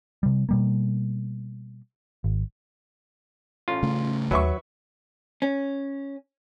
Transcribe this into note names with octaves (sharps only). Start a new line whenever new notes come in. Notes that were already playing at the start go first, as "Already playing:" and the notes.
C3 G3
B2 G3 A#3
G#1
A1 F4
C#3 A3
D#2 F#3 D#4 B4 E5 C#6
C#4